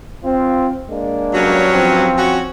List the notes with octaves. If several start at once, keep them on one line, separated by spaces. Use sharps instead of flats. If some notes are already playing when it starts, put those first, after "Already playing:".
C4 F4
G#3 A#3 D4
G2 F#3 C#4
F3 C4
C#4 F#4